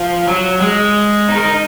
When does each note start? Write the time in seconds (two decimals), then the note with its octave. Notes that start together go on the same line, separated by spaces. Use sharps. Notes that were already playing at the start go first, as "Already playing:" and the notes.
Already playing: F3
0.28 F#3
0.61 G#3
1.29 D#4
1.36 A#4
1.45 D#4